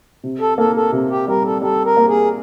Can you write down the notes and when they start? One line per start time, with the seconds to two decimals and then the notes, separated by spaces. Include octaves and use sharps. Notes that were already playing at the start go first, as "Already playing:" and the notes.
0.24 C3
0.40 A4
0.58 A#3 A4
0.76 A4
0.92 C3
1.10 G4
1.28 G3 A#4
1.45 A4
1.62 G3 A4
1.85 A#4
1.97 A#3
2.08 G#4